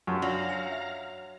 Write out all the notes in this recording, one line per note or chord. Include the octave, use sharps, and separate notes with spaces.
F#2 F4 G4 A5 C#6
F#3 D4 F4 D5 F5 A#5
C#5 G#5
E5